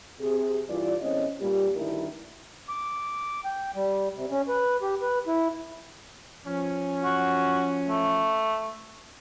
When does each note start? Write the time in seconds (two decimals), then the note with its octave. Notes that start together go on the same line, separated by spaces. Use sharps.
0.20 C3 G#4
0.69 G2 E3 F4 D5
1.01 E2 A2 C4 C#4 D#5
1.39 G2 A#2 G3
1.74 D2 G2 D#3 E4 A#4
2.69 D6
3.45 G5
3.75 G3
4.15 C3
4.31 C#4
4.48 B4
4.82 G4
5.02 B4
5.27 E4
6.46 F3 C#4
7.04 F#4
7.88 A3